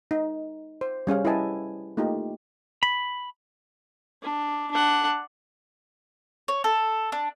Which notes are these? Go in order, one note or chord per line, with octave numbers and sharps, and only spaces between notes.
D#4
C5
G3 C#4 G#4 F5
E4 G4 B4 D#5 G#5 A5
A3 A#3 D#4 F4 G4
B5
D4
D4 F#5
C#5
A4
D4